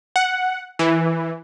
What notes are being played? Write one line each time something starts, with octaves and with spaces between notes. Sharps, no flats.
F#5
E3